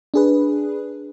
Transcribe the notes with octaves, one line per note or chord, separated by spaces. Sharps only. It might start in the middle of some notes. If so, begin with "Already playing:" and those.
D4 G#4 B4